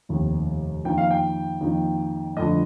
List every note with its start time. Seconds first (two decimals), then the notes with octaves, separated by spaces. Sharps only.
0.09 F1 D#2 D#3
0.85 F2 D#3 A#3 D#4 G5
0.98 F5
1.11 G5
1.61 F2 D#3 A#3 D#4
2.36 G1 F2 D3 A3 D#5